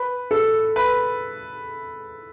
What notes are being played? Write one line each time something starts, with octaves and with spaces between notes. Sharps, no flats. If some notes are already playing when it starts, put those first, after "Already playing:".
Already playing: B4
A4
B4